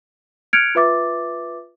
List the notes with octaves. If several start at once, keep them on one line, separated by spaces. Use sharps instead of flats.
F6 F#6 G#6 C#7 D7 F7
F4 B4 E5 D6 A6